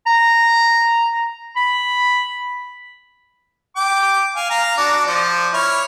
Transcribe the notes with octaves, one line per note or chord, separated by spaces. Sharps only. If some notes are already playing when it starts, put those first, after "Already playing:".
A#5
B5
G5 D6
F5 G#5
F5 A#5
D4 F#4 D5
F3 D5
E4 C#5 F6